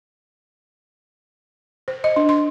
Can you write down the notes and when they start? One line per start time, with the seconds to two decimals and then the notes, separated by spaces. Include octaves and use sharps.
1.88 C5
2.04 D#5
2.16 D4
2.29 C6